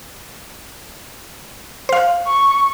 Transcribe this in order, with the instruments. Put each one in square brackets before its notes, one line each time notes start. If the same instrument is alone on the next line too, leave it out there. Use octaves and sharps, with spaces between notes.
[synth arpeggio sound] C5 F5
[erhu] C#6